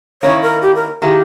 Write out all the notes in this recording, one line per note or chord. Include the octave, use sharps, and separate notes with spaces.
D#3 A#3 C#4 E4 C#5
A#4
G4
A#4
D#3 A#3 E4 G4 G#4